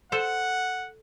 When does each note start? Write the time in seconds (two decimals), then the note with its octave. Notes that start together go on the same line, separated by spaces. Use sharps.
0.12 A4 C5 F#5